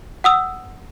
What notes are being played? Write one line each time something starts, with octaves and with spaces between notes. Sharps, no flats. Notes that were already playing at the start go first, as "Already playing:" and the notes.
F#5 D#6 E6